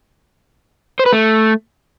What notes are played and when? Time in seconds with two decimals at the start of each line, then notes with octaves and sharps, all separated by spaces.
0.99 C5
1.06 B4
1.13 A3